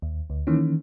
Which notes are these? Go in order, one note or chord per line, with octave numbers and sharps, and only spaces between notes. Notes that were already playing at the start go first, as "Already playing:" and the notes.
D#2
D2
D#3 E3 A#3 C#4